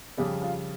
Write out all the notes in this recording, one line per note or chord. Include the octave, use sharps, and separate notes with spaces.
F2 C#3 G3 G4
F4